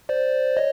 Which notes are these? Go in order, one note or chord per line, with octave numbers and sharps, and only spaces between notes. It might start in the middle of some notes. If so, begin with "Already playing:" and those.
C5 D5
C#5 D#5